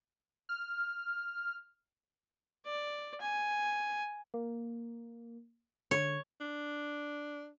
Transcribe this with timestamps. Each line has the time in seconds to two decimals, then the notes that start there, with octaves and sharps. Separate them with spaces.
0.49 F6
2.65 D5
3.21 G#5
4.34 A#3
5.91 D3 C#5
6.40 D4